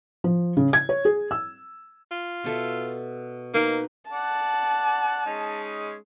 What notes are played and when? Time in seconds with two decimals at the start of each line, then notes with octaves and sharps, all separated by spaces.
0.24 F3
0.57 C#3
0.73 G#6
0.89 C#5
1.05 G#4
1.31 E6
2.11 F4
2.44 B2 A4 E5
3.54 A#3 D#4 B4
4.11 D5 F#5 A5
5.26 G#3 C#4 D#4